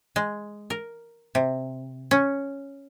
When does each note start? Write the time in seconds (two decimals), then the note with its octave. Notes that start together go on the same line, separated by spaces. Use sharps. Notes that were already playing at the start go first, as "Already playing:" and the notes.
0.16 G#3
0.70 A#4
1.35 C3
2.11 C#4